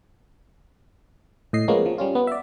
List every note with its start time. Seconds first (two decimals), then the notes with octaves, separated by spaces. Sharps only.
1.53 A2 D#5 C7
1.68 F3 G#3 A#3 B3 C#4
1.86 F3
1.98 G3 C#4 F4
2.15 B3
2.27 D5 E5